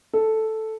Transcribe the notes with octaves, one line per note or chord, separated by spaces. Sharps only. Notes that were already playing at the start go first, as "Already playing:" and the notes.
A4